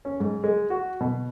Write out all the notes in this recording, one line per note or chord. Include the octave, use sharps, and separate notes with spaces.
C#4
G#2
G#3
F#4
B2